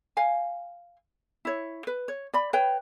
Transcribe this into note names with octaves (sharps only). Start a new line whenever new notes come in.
F5 G#5
E4 C#5
B4
C#5
D5 B5
B4 C#5 G5